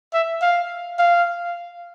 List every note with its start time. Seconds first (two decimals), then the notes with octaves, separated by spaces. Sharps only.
0.13 E5
0.42 F5
0.98 F5